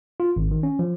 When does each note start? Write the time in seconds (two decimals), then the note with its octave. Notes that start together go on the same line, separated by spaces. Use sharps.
0.20 F4
0.36 G#1
0.51 D#3
0.63 C#4
0.79 F3